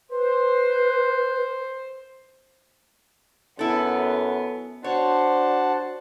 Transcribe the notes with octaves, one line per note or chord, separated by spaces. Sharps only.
B4 C5
F#2 B3 E4 A4
D4 F#4 C5 C#5 F#5 A5